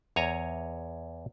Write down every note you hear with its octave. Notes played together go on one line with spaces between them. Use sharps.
E2 C#5 G#5 A#5